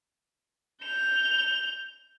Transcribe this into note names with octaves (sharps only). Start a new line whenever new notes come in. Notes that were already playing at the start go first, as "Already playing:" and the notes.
G6 F7